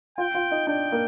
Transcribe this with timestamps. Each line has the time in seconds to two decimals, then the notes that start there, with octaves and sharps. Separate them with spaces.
0.18 F4 G5
0.35 F4
0.51 D#4
0.67 D4 G5
0.92 A#3